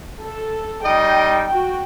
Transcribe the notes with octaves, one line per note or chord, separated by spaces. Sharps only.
A4
G3 D#4 D#5 G5
F#4 G5